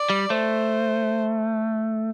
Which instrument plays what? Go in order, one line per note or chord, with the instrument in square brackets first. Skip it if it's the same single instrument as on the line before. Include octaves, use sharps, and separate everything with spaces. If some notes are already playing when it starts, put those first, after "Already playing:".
Already playing: [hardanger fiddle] D5
[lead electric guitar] G3
[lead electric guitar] A3 [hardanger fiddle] C5